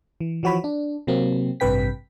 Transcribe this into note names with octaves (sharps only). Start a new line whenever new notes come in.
E3
E3 F3 F#4 C#5 B5
D4
C3 F#3 A#3 C4
A1 G2 C3 B4 G5 B6